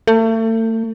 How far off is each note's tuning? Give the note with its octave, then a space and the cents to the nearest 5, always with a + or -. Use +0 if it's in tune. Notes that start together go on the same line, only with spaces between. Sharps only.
A3 +35